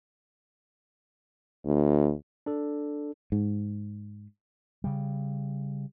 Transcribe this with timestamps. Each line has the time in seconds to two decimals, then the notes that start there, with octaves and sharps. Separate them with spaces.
1.65 D2
2.46 D4 A4
3.32 G#2
4.84 C#3 G3